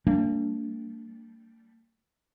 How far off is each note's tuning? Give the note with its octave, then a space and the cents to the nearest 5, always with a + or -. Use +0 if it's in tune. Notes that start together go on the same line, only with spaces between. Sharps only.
G3 +0 A#3 -40 D4 -20